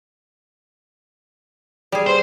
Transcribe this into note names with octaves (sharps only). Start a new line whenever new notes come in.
G3 G#4
C5